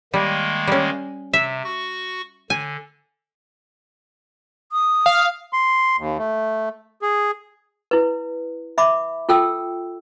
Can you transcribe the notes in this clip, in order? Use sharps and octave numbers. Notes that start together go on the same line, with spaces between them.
D#3 G3 G#3 A#3
G3 C#4
C3 E5
F#4 C#6
D3 G#5
D#6
F5
C6
D#2
A3
G#4
E4 B4
E5 B5 D6
F4 A4 G5 E6